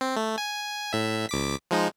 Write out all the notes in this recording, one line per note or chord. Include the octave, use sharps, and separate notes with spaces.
C4
A3
G#5
A2 E5
C#2 D6 B6
F3 G#3 D#4